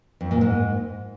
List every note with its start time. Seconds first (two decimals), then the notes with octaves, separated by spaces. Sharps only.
0.21 F2
0.31 A#2
0.41 G#2